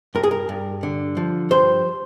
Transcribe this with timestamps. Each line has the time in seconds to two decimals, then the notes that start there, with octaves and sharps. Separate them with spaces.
0.15 G2 A#4
0.23 G#4
0.31 A#4
0.49 G2
0.83 D3
1.17 F3
1.51 G2 C5